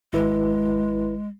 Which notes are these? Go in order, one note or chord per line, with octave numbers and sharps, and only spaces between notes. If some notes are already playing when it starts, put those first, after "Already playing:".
G#1 G#3 E4 B4